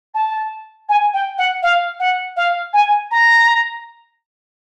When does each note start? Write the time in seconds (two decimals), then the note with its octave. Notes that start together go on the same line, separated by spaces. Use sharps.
0.14 A5
0.89 G#5
1.13 G5
1.38 F#5
1.62 F5
1.99 F#5
2.36 F5
2.73 G#5
3.10 A#5